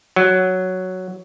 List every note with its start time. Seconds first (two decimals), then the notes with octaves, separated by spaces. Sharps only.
0.16 F#3